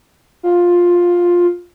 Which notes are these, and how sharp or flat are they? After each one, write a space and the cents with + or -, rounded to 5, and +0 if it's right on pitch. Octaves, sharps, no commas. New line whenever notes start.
F4 +10